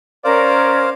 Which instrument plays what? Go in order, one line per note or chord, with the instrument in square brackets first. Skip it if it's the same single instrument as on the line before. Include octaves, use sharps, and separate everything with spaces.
[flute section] C#4 A#4 [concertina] C5 F5 [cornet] D5